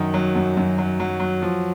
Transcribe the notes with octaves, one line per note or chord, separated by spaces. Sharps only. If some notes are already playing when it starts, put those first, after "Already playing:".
Already playing: F#2 D#3
F#3
F#2
F#2
F#3
F#3
F#3
F3